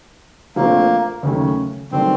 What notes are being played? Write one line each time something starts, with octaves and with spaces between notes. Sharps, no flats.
A#1 A#2 F3 A3 A#3 C4
D#2 C#3 F#3 A3 C#4
G2 D#3 F#3 A3 C4 D4